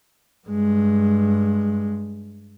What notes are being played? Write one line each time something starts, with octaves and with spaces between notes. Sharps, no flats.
G2 G#3